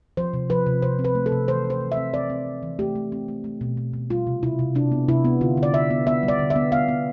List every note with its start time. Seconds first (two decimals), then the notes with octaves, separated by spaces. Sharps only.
0.17 F3 C5
0.34 C3
0.50 F3 B4
0.66 C3
0.82 C3 C5
0.99 C4
1.04 B4
1.15 A3
1.26 A4
1.32 C3
1.48 E3 C5
1.65 A3
1.70 C5
1.81 E3
1.92 E5
1.97 C4
2.14 C4 D5
2.30 C4
2.46 E3
2.63 E3
2.79 A3 G4
2.95 A3
3.12 C4
3.28 A3
3.44 A3
3.61 B2
3.77 B2
3.93 B2
4.10 G3 F4
4.27 C3
4.43 C3 E4
4.59 C3
4.75 C3 D4
4.92 B3
5.08 C3 E4
5.25 B3
5.41 D3 F4
5.57 D3
5.63 D5
5.74 D3 E5
5.90 B3
6.07 B3 E5
6.23 G3
6.28 D5
6.39 D3
6.50 E5
6.56 B3
6.72 B3 F5
6.88 B3